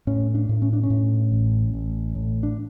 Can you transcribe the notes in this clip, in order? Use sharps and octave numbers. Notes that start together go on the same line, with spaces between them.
A2 C#4
D4
A2
C#4
D4
C#4
A2
A1
A1
A2
D4